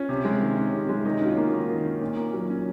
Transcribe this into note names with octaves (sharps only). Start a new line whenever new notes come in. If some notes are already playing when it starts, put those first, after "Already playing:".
Already playing: C#4 F4
C3
G#3
D#3
C#4
C3
G#3
D#3 D#4
C#4 F#4
F4
A#3
D#3
D#3
C#4
A#2
A#3
F#3
C#4